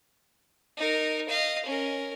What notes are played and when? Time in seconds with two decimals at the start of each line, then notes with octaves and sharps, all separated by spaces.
0.77 D#4 A#4
1.29 D#5 F5
1.66 C#4 A#4